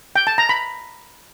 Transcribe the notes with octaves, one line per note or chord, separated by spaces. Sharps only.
G5
A5
A#5
B5